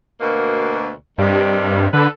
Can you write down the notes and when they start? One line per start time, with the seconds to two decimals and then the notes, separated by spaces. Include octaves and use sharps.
0.21 D2 B2 A#3
1.18 G2 C3 D#3 G3
1.93 D3 A4 B4